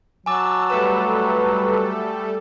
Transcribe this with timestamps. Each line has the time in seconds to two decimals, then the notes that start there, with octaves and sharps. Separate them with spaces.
0.26 F#3 G#5 A5 D6 E6
0.70 G3 A3 A4 B4 E7